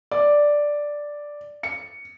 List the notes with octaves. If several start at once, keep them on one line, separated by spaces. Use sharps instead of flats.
D5
C#7